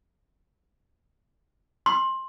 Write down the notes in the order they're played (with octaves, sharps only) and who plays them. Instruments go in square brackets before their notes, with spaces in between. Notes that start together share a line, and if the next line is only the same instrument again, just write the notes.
[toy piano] C6